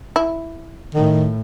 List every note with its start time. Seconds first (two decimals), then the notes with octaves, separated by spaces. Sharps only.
0.16 E4
0.94 A2 D#3